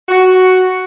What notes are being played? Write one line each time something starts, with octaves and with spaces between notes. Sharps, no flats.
F#4